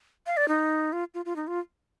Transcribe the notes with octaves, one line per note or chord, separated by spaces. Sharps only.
F5
D5
D#4
F4
F4
F4
D#4
F4